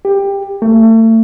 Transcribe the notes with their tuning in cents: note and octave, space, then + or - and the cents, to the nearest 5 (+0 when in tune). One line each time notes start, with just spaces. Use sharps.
G4 +15
A3 +35